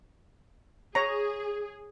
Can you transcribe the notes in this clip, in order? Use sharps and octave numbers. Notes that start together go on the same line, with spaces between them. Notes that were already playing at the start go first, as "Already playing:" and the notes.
G#4 C#5 A#5